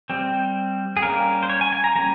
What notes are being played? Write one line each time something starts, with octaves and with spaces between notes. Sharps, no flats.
G3 C4
G#4
G3 A#3 C#4 A#4
C5
C#5
G#5
G#5
A#5
G3 A#3 C#4 A#5